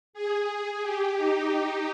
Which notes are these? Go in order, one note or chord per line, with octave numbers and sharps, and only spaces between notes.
G#4
G4
D#4